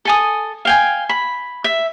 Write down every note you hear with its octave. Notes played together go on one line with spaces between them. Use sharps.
A4 G#5 D#6
F5 G5 G#5
B5
E5